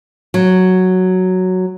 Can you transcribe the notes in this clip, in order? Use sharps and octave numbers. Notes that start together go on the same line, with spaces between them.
F#3